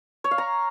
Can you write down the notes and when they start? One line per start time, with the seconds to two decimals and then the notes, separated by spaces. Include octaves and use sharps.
0.24 C#5
0.31 F5
0.38 A#5